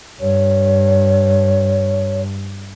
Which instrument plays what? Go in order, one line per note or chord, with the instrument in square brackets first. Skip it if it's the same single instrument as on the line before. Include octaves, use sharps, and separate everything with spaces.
[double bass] G2 [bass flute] C#5